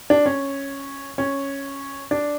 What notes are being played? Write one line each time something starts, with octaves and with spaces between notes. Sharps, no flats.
D4
C#4
C#4
D4